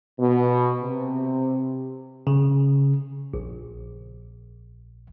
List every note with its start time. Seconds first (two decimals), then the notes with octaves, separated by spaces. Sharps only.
0.19 B2
0.81 C3
2.27 C#3
3.34 A#1